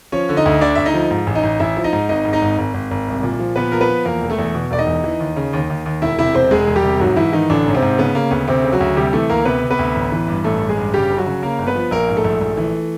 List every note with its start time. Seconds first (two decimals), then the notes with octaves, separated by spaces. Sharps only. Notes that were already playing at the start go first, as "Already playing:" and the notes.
0.12 F3 C#4 C#5
0.29 D3
0.37 D#4 D#5
0.46 D2
0.61 D3 D4 D5
0.75 D2 E5
0.85 D#4 D#5
0.94 F3
1.11 G#2
1.27 A1
1.35 D#4 D#5
1.43 A1
1.60 A1 E4 E5
1.77 F3
1.84 D#4 D#5
1.93 G#2
2.09 G#1 D#4 D#5
2.25 G#2
2.33 D#4 D#5
2.42 G#1
2.58 G#1
2.74 G#1
2.91 G#1
3.08 C2
3.23 A#2
3.39 F3
3.56 A#2 B3 B4
3.72 F3 A#4
3.81 B3 B4
3.89 F3
4.05 E2 A#3 A#4
4.21 E1
4.30 A3 A4
4.38 E2
4.55 B2
4.71 E1 D5
4.79 D#4 D#5
4.87 E2
5.04 E3
5.20 D#2
5.36 C#3
5.53 D#2
5.70 D#2
5.86 D#2
6.02 E1 E4 E5
6.19 C3 E4 E5
6.34 E1 C4 C5
6.51 E1 G#3 G#4
6.68 E1
6.76 G3 G4
6.84 C3
7.00 G#2 F#3 F#4
7.17 G#2 E3 E4
7.32 D#3 E3 D#4
7.50 A1 D3 D4
7.66 G#2 C#4
7.75 C3 C4
7.82 G#2
7.98 C#3 B3
8.15 C#3 A#3
8.31 D2 B3
8.48 D2 C3 C4
8.63 C#3
8.73 F#3 F#4
8.80 D2
8.96 C3 G3 G4
9.13 E3 A3 A4
9.29 D2 A#3 A#4
9.45 C3 B3 B4
9.62 C3
9.70 B3 B4
9.79 D2
9.95 A1
10.12 E3
10.28 G2
10.44 A1 A3 A4
10.61 A1
10.69 G#3 G#4
10.77 G2
10.94 C#3 G3 G4
11.10 G1
11.18 F#3 F#4
11.26 C#3
11.43 C#3 A#3 A#4
11.59 G1
11.67 B3 B4
11.75 F3
11.91 A#1 A#3 A#4
12.08 G#2
12.16 A3 A4
12.24 A#1
12.41 A#1
12.57 E3